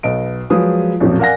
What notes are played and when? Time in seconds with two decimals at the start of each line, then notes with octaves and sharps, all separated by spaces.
0.03 B1 B3 D#5 D7
0.50 F3 F#3 G#3 G#4 B4 D#6
1.00 A1 F2 A#2 F3 F#3
1.19 A#4 D5 F5 F#5 G#5 A#6